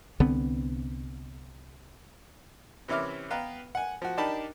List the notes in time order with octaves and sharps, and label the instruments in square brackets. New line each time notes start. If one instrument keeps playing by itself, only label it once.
[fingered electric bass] C2 D3 B3 C4
[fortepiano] C3 E3 C#4 E5 D6 F6
B3 B4 F5 G5 A#5
F#5 G#5
F3 F#4
D4 D#4 G4 A#4 A5 B5